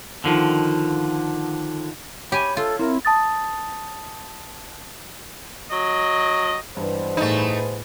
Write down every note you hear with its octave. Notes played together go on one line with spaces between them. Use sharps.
D3 D#3 F3
G4 C#5 G#5 B5
F4 A4
C4 E4 A#4
A5 D#6 A6
F#3 D#5
G2 B2 E3 G3 B4 C5
A2 A3 D#4 G#4